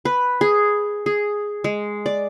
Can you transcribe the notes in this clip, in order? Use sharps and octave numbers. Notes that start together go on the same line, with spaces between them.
B4
G#4
G#4
G#3
D5